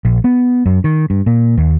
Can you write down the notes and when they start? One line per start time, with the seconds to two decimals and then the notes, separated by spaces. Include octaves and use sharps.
0.05 A#1
0.24 B3
0.66 F#2
0.84 D#3
1.10 G2
1.26 A#2
1.57 D#2